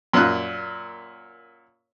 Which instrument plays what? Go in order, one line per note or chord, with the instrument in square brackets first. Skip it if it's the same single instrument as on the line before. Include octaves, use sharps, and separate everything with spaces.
[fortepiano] F#2 A#2 F#6